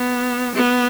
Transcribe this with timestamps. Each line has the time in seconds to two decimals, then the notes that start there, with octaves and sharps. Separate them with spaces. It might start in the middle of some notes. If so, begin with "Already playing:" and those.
Already playing: B3
0.55 B3